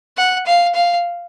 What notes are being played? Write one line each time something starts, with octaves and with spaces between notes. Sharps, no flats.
F#5
F5
F5